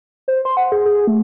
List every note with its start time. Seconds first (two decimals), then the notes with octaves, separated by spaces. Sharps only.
0.28 C5
0.45 C6
0.57 F#5
0.72 G#4
0.85 G#4
1.07 A3